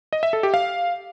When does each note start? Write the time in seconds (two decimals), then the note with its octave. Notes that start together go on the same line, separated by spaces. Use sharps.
0.13 D#5
0.23 E5
0.33 A4
0.43 G4
0.54 F5